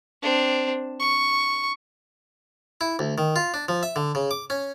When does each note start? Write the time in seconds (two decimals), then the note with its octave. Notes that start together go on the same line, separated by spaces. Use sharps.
0.22 C4 D4
1.00 C#6
2.81 E4
2.99 D2
3.18 D#3
3.36 F4
3.54 D4
3.68 F3
3.83 E5
3.96 D3
4.15 C#3
4.31 D6
4.50 C#4